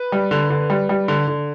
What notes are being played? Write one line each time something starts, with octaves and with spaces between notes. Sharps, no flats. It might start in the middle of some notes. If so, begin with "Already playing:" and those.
Already playing: B4
G3
D3
D3
G3
G3
D3
D3